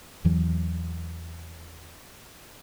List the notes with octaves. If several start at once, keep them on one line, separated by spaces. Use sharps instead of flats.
E2 E3 F#3